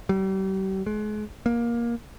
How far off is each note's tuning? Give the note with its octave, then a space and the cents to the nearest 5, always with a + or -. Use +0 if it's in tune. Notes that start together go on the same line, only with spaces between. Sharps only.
G3 -40
G#3 +35
A#3 +15